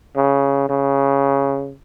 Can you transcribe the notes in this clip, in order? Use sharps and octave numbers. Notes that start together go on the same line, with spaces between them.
C#3
C#3